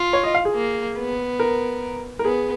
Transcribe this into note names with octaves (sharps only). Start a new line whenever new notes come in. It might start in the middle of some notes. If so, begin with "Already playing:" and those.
Already playing: F4
C#5
D#5
F5
G#4
A#3
B3
A#4
A#4
B3 G#4